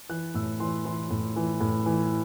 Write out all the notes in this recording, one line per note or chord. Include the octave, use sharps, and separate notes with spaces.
E3 F#6
A2 E6
E3 C6
E3 C6
A2
E3
A2
E3